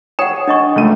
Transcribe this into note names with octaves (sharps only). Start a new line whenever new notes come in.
C#5 F#5 G5 D#6 E7
D4 D#5 C#6
C#2 A3 D#7